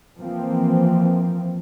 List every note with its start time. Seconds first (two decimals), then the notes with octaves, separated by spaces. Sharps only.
0.20 E3 F3 A#3 C4